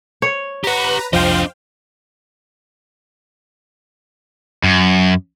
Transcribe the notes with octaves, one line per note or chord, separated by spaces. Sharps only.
C#5
G4 B4 F#5 A#5
C2 F2 F3 D4 C5 D#5 F5 G5
F#2